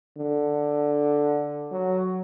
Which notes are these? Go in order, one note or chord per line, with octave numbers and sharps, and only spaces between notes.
D3
F#3